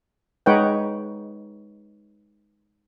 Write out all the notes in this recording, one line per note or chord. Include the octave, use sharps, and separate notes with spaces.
G#3 D#4 B4 C#5 F#5 G5